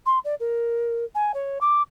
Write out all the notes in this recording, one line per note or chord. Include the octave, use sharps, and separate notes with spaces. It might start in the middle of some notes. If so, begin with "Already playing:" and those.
C6
D5
A#4
G#5
C#5
D6